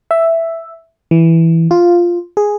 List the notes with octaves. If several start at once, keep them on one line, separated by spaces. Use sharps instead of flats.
E5
E3
F4
G#4